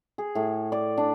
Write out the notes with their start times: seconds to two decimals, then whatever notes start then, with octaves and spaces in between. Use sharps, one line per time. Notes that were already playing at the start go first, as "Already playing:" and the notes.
0.18 G#4
0.35 A2
0.72 D5
0.98 D4